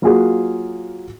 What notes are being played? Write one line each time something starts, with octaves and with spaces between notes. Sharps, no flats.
F#3 A#3 F4 F#4 G#4